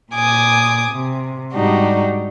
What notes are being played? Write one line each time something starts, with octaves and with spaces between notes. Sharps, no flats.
A#2 G#5 D6 D#6
C3
G#2 G3 D4 D#4 F#4 G4